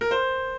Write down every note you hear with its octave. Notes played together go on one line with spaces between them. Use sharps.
A#4
C5